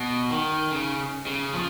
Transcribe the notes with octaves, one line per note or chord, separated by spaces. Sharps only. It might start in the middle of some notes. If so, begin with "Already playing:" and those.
Already playing: B2
D#3
C#3
C#3
F3